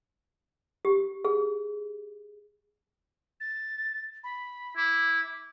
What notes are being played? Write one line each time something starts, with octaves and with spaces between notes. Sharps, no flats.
G4
G#4
A6
B5
E4 D6